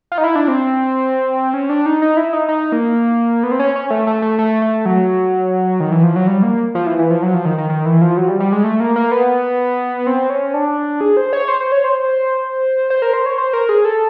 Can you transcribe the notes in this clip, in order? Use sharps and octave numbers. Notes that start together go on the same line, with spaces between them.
F4
D#4
E4
D4
C4
C#4
D4
D#4
D#4
E4
D#4
D#4
A#3
B3
C4
C#4
C#4
A3
A3
A3
A3
A3
F#3
D#3
E3
F3
F#3
G3
A#3
F3
E3
E3
F3
F#3
F3
D#3
D#3
D#3
E3
F3
F#3
G3
G3
G#3
A3
A#3
A#3
B3
C4
C#4
D4
G#4
C5
C#5
C5
C5
C#5
C5
C5
A#4
C5
C#5
C5
A#4
G#4
A4